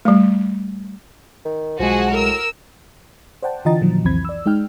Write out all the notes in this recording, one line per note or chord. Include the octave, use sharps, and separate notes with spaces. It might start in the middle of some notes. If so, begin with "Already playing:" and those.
G3 A3
D#3
B1 F3 G#3 F#4 G#4 F#5
A2 A#4 E6
C5 D5 F#5 G5 A5
D3 E3 F4 D#5 A#5 A6
A#2 D3 D#3 F3 F#3
C2 F2 E3 C4 B5 G#6
D5 E6
G#3 D#4 G5 F6